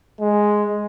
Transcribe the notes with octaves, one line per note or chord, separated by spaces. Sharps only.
G#3